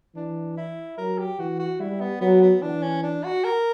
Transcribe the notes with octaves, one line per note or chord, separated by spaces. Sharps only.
E3 D4
E4
F#3 A#4
G4
E3 F#4
F#4
G3 E4
B3
F#3 B3
B3
E3 D4
C#4
D4
F#4
A#4